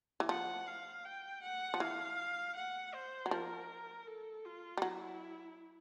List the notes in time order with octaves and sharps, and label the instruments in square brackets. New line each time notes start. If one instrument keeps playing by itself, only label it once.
[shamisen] E3
[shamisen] F3 [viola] F#5
[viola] F5
G5
F#5
[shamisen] F3
[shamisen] E3 [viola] F5
[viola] F#5
C5
[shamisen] F#3
[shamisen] F3 [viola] A#4
[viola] A4
F4
[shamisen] G3
[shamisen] F#3 [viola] E4